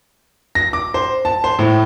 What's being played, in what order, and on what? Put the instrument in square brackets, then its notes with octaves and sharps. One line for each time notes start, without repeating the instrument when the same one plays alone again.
[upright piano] A#6
D6
C5
A5
C5
A2